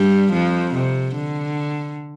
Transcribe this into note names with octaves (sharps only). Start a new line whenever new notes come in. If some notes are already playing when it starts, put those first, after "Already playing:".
Already playing: G2 G3
F2 F3
C3
D3